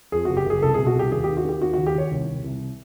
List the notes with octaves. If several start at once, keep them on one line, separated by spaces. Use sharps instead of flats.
F2 G#4
F#1 F#4
G4
F#1 G#4
C2 A4
G#4
B2
F#4
C2 G4
D#2 G#4
G4
D#3
F#4
D#2 G4
D#3 F#4
F#4
D#2
G4
D#2 C#5
C2
C2
C2